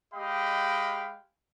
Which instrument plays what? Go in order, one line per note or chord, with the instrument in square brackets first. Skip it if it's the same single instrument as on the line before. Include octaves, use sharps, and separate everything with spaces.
[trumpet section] G#3 G4 D#5 F5 G5 B5